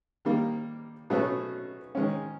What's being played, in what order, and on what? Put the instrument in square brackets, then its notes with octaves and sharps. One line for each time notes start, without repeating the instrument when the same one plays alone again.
[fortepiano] D#3 G3 A#3
B2 F#3 A3 C#4 F#4
D#3 G#3 C#4